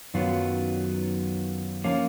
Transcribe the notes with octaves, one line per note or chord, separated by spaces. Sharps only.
F#2 D#3 F#3 B3 F4
F3 A#3 C#4 F4